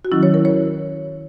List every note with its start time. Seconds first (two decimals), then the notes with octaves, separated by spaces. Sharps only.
0.05 F#4
0.11 D#3 F#3 C#4 E4
0.23 C#5
0.34 A#4
0.45 C#5